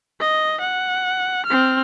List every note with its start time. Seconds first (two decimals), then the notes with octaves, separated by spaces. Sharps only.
0.20 D#5
0.61 F#5
1.46 C4 F6